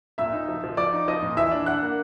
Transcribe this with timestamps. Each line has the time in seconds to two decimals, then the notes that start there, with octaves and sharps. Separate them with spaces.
0.18 A#2 E5 E6
0.33 D#4
0.48 F3
0.64 F3
0.77 F3 D5 D6
0.93 D#4
1.08 F3 D#5 D#6
1.23 A#2
1.37 E3 E5 E6
1.52 D4
1.66 D4 F#5 F#6
1.82 A#3